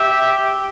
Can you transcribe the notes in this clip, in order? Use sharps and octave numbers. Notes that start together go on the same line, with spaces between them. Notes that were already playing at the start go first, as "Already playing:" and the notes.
Already playing: G4 E5